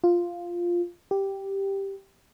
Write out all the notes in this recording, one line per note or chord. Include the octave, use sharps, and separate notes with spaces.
F4
G4